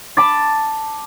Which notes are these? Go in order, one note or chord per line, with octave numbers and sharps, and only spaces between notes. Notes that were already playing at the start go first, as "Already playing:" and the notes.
A5 B5 D6 A6